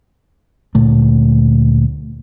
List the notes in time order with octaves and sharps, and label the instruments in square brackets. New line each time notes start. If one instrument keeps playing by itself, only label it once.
[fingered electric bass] D2 A#2 A3